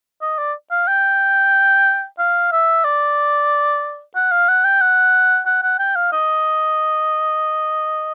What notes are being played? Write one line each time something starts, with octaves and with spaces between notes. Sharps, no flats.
D#5
D5
F5
G5
F5
E5
D5
F#5
F5
F#5
G5
F#5
F#5
F#5
G5
F5
D#5